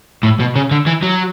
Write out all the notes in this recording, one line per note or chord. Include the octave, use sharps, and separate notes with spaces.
A2
B2
C#3
D3
E3
F#3